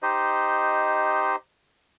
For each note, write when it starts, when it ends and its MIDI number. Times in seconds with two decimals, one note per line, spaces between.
0.02 1.36 63
0.02 1.36 67
0.02 1.36 72
0.02 1.36 75